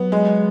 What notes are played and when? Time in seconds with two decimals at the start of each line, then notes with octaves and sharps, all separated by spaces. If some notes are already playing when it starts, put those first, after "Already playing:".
Already playing: F#3 B3
0.12 G#3